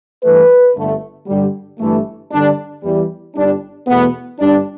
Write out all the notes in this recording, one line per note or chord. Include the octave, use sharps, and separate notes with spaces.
G2 E3 A3 B4
G1 G2 D3 A3
G2 D3 G3
G1 G2 E3 A3
G2 D3 G3 D4
E2 E3 G3
G1 G2 G3 D4
E2 B2 A3 B3
G1 G2 G3 D4